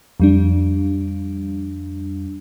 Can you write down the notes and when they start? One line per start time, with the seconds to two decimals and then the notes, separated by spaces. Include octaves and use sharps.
0.20 F2 G3 D4